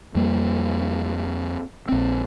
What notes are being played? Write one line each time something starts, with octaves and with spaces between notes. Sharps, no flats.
F2 G3 A#3
A#1 C4